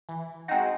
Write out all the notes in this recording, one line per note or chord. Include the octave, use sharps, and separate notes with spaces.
E3
G#3 C4 D#4 F#4